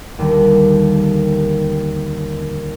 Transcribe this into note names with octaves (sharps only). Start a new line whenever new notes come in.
D#2 D3 D#3 G3